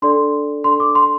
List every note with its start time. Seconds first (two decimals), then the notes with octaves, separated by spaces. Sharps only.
0.02 D4 A4 D5 C6
0.64 D4 A4 D5 C6
0.80 D6
0.95 C6